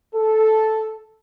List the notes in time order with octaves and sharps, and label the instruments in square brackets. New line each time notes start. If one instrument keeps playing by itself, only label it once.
[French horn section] A4